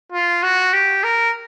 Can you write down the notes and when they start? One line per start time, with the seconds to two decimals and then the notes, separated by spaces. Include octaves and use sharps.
0.12 F4
0.43 F#4
0.73 G4
1.04 A#4